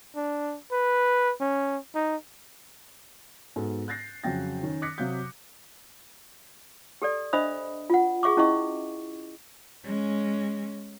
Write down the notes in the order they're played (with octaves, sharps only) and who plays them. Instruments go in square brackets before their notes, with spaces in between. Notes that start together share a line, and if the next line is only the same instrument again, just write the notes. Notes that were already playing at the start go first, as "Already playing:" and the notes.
[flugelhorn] D4
B4
C#4
D#4
[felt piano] G#2 B3 F#4 A4
F#6 G6 A6 A#6 C7
F2 C#3 F#3 G5 A6 A#6
D#3 C#4
D6 D#6 F#6 A#6 B6 C#7
C3 F#3 F5 F#6 G6
[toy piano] G4 A4 D5
D4 C5 D#5 E5 B5 D#6
F4 F#5
G#4 E5 C#6 D6
C#4 E4 D#5 E5 C#6
[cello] G#3 C#4